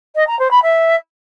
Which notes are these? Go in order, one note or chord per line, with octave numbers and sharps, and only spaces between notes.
D#5
A#5
C5
B5
E5